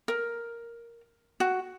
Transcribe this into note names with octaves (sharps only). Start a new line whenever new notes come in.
A#4
F#4